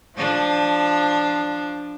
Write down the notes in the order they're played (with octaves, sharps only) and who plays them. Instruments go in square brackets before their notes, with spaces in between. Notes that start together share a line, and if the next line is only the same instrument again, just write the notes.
[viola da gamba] F3 D4